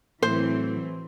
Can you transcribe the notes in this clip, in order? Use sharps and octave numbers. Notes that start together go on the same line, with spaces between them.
A2 E3 F#3 C4 C5